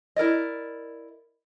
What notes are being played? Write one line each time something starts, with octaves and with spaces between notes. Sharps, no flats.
E4 A#4 D5 D#5